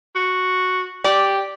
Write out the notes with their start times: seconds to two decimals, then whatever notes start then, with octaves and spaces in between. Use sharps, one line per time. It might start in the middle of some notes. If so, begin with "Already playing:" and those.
0.16 F#4
1.04 G4 D5